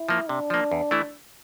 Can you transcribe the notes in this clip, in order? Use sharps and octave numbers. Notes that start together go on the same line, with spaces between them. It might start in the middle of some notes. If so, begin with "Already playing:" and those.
Already playing: E4
F3 A#3
C3 D4
F3 A#3
E2
E3 A3 E4